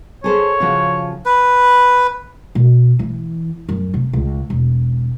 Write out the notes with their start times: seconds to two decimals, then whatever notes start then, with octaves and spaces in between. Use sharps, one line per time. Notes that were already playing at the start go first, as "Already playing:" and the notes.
0.24 G#4 A4 C5 C#5
0.60 C#3 F3 F#4
1.25 B4
2.55 B2
2.99 E3
3.69 F#2
3.94 C3
4.13 C#2
4.50 E1